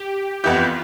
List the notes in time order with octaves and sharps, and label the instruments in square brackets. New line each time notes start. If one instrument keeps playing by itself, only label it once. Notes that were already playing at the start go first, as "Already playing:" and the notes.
Already playing: [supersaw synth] G4
[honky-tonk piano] F2 E3 B3 E4 G4 [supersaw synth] F4